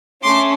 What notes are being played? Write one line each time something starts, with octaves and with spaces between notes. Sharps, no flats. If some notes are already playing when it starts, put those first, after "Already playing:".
A3 C#4 C6 D6